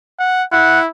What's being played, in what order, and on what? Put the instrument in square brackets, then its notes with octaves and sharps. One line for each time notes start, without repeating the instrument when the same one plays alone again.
[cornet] F#5
[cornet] E4 [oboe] F#5